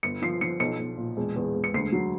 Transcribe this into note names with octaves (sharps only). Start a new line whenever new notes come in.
G1 C#7
F3 C7
F3 C#7
B1 C#7
B1
A#2
E1
E2
E1
C#7
D2 C7
F#3